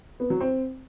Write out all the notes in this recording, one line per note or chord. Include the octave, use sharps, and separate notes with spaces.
B3
F#3
C4